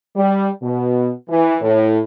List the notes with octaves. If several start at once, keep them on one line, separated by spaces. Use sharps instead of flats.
G3
B2
E3
A2